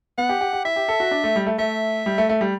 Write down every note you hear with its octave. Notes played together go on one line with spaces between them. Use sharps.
B3 F#5
G4
G4
G4
E4 E5
G4
A4
F#4
D4
A3
G3
A3
A3 E5
G3
A3
A3
G3